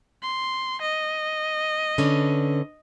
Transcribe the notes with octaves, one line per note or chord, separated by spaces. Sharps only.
C6
D#5
D3 C#4 B4